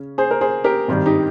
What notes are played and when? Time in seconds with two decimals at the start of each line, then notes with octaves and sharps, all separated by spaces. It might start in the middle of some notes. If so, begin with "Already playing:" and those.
Already playing: C#3 C#4
0.18 G#4 C5
0.31 A#4
0.41 G#4 C5
0.64 G4 A#4
0.88 G#1 G2 D#3 G3
1.06 D#4 G4